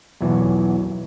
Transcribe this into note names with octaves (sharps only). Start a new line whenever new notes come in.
B1 E2 E3 F#3